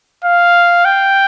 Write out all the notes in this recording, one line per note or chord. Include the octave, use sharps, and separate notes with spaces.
F5
G5